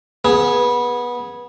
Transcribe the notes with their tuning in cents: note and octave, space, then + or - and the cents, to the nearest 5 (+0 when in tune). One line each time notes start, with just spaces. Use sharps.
B3 -20 G#4 +0